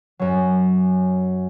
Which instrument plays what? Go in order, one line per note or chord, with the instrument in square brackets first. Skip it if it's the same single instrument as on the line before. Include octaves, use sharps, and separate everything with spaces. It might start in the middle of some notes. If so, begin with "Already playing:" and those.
[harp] F#2 F#3